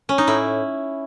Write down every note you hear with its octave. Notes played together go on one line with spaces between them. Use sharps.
C#4
D#4
A2 E4